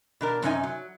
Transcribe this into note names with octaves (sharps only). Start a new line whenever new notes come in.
B2 D4 A#4
F#2 C3 C#4 D#4 G#5
F#3